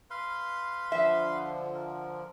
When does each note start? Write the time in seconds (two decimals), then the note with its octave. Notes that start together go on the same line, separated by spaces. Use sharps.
0.10 B4 F5 C6
0.92 D3 F3 E5
1.75 A#4